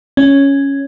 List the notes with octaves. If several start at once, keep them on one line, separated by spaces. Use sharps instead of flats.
C#4